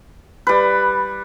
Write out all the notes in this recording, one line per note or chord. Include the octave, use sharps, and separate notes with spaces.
G3 B4